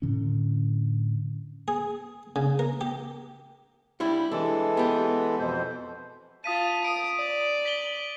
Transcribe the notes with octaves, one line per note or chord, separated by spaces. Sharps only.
A2 D3 C#4
G#4
C#3
A#4
G4
G3 D4 E4
E3 G#3 D4 A4
B3 G4
F2 B2 C5
F4 A5 D#6 B6 D#7
D#6 D7
D5
B6 F#7 G7